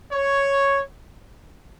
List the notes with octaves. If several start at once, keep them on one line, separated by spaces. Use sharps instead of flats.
C#5